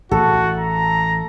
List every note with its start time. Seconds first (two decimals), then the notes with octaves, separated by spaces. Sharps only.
0.11 A1 F#4 A4
0.59 A#5